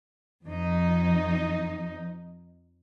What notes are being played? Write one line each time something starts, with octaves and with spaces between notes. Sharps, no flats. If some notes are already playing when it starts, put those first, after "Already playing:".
F2 D#4